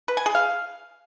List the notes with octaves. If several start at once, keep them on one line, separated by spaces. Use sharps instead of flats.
B4
G#5
G#4
F5